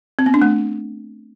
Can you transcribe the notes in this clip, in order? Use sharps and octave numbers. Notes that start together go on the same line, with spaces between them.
C4
B3
D4
A3